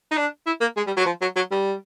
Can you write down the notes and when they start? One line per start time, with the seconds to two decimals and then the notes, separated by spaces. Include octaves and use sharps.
0.11 D#4
0.17 D4
0.46 E4
0.61 A#3
0.77 G#3
0.87 G3
0.97 F#3
1.06 F3
1.21 F#3
1.36 F#3
1.51 G3